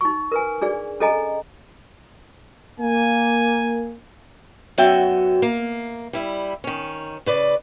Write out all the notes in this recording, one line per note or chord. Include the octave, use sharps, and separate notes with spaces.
D#4 C#6
A#4 B4 G#5
D4 G#4 D5
C#4 G#4 A4 D#5 G#5 A#5
A#3 G#5
F#2 F#3 B3 F#4 E5 G5
A#3
G3 E4
D#3 C#4
C#3 B4 D5